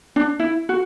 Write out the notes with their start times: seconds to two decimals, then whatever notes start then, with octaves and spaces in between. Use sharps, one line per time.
0.16 D4
0.40 E4
0.69 F#4